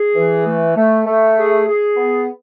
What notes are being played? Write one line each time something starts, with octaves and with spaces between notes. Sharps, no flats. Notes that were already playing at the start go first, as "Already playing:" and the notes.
Already playing: G#4
E3
A3
A3
A3
G#4
G#4
B3